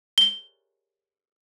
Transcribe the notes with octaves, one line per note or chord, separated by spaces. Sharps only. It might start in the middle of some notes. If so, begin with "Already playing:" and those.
G7